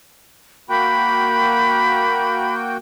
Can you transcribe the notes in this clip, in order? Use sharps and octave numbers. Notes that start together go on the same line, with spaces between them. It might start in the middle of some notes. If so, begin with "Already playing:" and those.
A#3 F#4 G5 B5